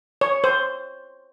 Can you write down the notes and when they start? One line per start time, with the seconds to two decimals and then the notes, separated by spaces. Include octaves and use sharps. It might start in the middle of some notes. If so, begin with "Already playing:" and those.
0.21 C#5
0.44 C5